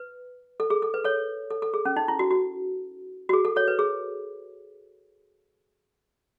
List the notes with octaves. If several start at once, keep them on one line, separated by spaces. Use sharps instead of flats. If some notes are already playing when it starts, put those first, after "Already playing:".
Already playing: B4
A4
G#4
A4
B4
A4 C#5
A4
A4
G#4
C#4
D#4
E4
F#4
F#4
F#4
G#4
A4
A4 C#5
B4
G#4